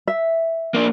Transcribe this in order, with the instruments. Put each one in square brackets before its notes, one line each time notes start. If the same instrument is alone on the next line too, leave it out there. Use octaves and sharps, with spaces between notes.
[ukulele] E5
[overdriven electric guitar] A#3 D4